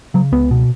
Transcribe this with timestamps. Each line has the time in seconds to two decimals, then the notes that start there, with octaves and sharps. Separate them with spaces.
0.14 C#3 F#3
0.32 C#2 B3
0.51 B2